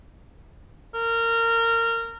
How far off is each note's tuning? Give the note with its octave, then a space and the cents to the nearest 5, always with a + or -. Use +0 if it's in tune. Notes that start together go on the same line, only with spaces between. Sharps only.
A#4 -20